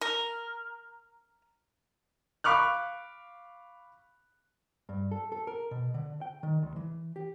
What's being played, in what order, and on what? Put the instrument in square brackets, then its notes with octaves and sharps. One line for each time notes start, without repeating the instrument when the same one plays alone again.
[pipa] A#4
[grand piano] F5 B5 C#6 D6 F6 F#6
[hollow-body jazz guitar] G2
A4
A4
A#4
B2
D3
G5
D#3
D2
E3
G4